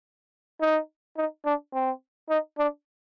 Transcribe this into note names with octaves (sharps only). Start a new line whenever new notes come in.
D#4
D#4
D4
C4
D#4
D4